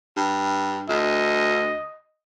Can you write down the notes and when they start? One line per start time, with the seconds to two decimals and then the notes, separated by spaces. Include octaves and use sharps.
0.16 G2
0.89 D2 D#5